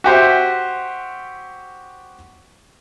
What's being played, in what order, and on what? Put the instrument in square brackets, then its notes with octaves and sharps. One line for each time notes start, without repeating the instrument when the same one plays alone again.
[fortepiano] F#4 G4 C5 E5